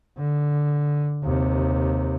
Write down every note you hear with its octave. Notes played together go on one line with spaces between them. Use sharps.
D3
D#2 C3